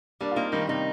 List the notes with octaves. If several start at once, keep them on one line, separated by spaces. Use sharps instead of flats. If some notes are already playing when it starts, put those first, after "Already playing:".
G3 A#3 D4
F4
A#3 C4 D#4
D#3 G3 D#4
C3 D#3 D#4